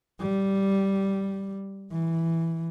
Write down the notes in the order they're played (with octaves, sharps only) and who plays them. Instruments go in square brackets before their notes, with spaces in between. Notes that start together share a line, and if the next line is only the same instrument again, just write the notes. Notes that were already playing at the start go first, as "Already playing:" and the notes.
[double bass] G3
E3